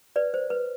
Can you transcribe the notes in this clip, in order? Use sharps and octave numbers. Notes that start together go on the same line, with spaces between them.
B4 D5
C5
B4